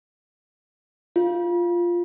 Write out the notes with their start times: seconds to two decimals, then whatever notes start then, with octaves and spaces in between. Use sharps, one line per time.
1.16 F4